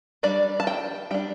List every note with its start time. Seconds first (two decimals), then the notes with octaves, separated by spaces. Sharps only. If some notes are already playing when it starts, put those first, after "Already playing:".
0.23 G3 D4 D5
0.60 A5
0.67 G5
1.11 G3 D4 G5